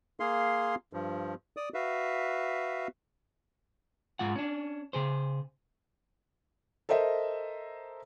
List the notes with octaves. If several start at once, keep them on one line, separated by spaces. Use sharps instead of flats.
A#3 G#4 F5 C6
G2 F3
D5 D#6
F#4 B4 E5 F5
G#2 G#3 F4 F#5
C#4 D4
C#3 G#4 C5
A4 A#4 C5 D#5 E5